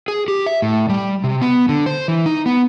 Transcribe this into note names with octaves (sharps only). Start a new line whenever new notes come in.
G#4
G4
E5
A2
G3
C3
B3
D3
C5
E3
D#4
B3